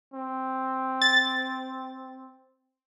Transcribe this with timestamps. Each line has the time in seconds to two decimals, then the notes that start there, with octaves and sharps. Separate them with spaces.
0.14 C4
1.02 A6